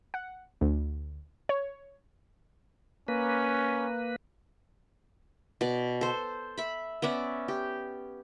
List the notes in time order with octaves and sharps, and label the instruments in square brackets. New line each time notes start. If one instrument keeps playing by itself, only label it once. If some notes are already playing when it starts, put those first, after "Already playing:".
[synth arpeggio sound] F#5
D2
C#5
[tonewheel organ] A#3 B4 [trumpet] C#4
[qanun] B2 D5
A4 C5
E5 B5
B3 C#4 D5 E5
G4